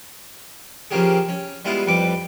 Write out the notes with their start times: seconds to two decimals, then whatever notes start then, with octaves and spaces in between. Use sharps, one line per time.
0.91 C#3 F3 A#3 C#4 G4 G#4
1.29 C#4
1.65 G3 G#3 B3 E4 F4
1.87 F2 G3 B4 D6